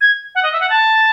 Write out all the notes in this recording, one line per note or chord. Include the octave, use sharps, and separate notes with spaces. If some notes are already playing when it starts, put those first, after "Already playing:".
G#6
F#5
D#5
E5
F#5
A5